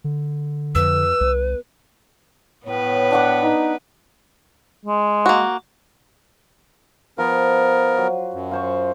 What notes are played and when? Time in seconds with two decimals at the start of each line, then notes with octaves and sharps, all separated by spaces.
0.04 D3
0.75 F2 F3 B4 E6
1.21 C2 B3
2.67 A2 B3 B4 C#5
3.11 D4 F#5 D6
3.43 D#4
4.86 G#3
5.26 A#3 F#4
7.18 F3 B3 A#4
7.97 F#3
8.34 F#2
8.51 F4 C5 C#6